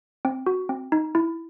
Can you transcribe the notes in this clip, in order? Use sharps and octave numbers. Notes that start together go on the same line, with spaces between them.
C4
F#4
C4
D#4
E4